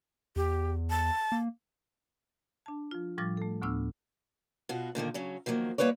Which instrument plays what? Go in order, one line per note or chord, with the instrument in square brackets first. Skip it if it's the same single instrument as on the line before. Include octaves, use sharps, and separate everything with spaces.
[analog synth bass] E2 [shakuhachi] G4
[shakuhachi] A5
[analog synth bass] A#3
[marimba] D4 A5
F3 F4
A2 F3 G3 D6 F6 A6
A3 A4
D2 A2 B3 D4 E6 F6
[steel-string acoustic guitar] B2 F4 F#4
A#2 D3 D#3 A#3
C#3 F#3 C#4
D#3 F3 F#3 A3 A#3
G3 A#3 E4 G4 B4 C#5